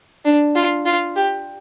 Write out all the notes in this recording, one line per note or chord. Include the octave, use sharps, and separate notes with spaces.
D4
F4
F4
G4